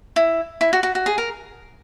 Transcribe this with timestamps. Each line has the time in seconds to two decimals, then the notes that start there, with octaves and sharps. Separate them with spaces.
0.16 E4
0.61 E4
0.73 F#4
0.83 F#4
0.95 F#4
1.06 G#4
1.18 A#4